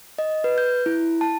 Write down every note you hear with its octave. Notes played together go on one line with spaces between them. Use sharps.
D#5
B4
G6
E4
A5